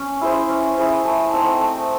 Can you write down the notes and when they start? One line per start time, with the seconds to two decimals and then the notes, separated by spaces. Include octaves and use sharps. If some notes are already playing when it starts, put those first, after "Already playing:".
Already playing: C#4
0.21 E4 G#4 C5
0.49 C#4
0.77 E4 G#4 C5
1.05 A3
1.33 C4 D#4
1.61 A3